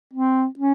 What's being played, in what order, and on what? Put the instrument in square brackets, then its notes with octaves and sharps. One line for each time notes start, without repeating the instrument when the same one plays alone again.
[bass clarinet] C4
C#4